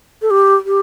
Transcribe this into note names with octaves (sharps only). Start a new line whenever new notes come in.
A4
G4
G4